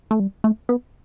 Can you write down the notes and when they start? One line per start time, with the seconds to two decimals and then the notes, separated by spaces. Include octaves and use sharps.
0.11 A3
0.20 G3
0.44 A3
0.69 B3